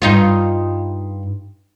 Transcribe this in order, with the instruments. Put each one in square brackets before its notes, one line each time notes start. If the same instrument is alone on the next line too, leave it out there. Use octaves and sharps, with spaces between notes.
[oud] G2 D#4 F4